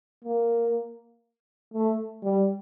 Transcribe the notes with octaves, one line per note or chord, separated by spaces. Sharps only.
A#3
A3
G3